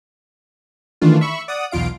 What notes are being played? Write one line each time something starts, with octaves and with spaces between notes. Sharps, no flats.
D#3 E3 A3 D4 F4
E5 B5 C#6
D5 F#5 D#6
B1 E2 F4 F5 D7